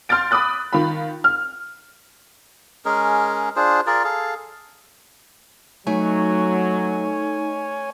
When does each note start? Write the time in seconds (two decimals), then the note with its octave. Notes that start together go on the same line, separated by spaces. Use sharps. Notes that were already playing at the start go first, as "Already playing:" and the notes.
0.09 C6 F6 G6 A6 D7
0.31 B5 D6 D#6 F#6 A6
0.73 D#3 F4 B5
1.24 F6
2.85 G#3 C#4 G#4 A#4
3.56 D4 F4 G#4 C5
3.87 F4 G#4 A#4 D5
4.04 G#4 A4 F5
5.87 F#3 A3 D#4 C#5 G#5